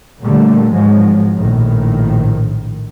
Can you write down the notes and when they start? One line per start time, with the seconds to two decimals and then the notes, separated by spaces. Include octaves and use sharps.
0.22 A#2 D3 G3 A3 A#3
0.72 G#1 G#2 F3 F#3 G#3
1.35 A#1 A2 D#3